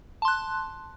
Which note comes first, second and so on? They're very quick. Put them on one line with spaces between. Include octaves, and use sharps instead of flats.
A5 C6 F#6